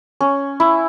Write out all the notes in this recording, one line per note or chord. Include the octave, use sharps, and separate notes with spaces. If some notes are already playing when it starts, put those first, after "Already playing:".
C#4
E4